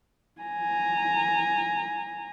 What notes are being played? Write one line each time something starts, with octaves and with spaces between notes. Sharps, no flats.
G#5 A#5